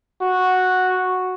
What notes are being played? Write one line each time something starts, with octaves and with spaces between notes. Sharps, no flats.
F#4